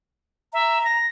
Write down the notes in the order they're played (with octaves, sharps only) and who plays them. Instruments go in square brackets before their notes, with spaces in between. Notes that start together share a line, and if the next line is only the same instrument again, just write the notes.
[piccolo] E5 [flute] A#5
[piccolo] A#6